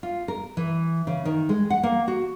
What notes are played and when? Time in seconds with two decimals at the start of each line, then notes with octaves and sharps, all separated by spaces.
0.03 F4
0.28 A#4
0.57 E3
1.07 C#3
1.25 D#3
1.49 G#3
1.70 F#5
1.83 A#3
2.08 F#4